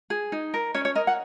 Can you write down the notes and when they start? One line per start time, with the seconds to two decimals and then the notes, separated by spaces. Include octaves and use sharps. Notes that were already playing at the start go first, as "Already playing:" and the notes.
0.10 G#4
0.32 D#4
0.54 A#4
0.74 C#4 C#5
0.85 C#5
0.95 A#4 D#5
1.07 F#5